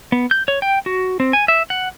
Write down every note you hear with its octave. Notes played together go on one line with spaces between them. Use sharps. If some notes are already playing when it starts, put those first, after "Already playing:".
B3
G6
C#5
G5
F#4
C4
G#5
E5
F#5